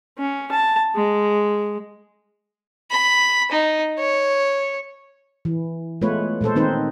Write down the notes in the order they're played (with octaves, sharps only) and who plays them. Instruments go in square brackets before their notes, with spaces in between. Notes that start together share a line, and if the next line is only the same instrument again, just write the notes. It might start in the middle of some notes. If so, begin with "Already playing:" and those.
[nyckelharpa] C#4
A5
G#3
[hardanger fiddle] B5
D#4
C#5
[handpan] E3
G#3 A3 B3 F4 B4 C#5
A#2 G#3 A4 C5
D#3 C4 D#4 B4 C5